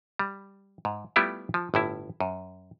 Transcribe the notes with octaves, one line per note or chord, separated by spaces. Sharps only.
G3
G#2
G3 A3 B3 E4 F4 G4
F3
G1 A2 E4
F#2